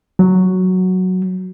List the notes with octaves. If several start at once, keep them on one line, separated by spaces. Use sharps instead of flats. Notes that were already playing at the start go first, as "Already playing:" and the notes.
F#3